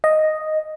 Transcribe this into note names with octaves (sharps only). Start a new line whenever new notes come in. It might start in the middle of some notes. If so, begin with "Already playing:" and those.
D#5